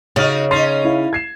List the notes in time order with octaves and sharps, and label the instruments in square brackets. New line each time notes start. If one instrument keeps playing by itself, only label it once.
[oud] C#3 [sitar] C#4 D#4 F#4 [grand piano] F6 A6
[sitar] C#4 D#4 [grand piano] C6 A6 C7
[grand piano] E4 F5
G#6 C7 E7